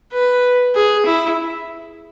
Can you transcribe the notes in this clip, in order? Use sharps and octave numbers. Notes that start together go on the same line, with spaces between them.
B4
G#4
E4